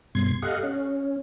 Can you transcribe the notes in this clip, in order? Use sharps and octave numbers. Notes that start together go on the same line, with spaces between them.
G2 B2 C6 G#6
G4 A4 D#5 F5 F#5
C#4